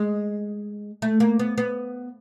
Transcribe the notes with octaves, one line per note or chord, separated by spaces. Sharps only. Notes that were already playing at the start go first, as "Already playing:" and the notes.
Already playing: G#3
A3
A#3
B3
B3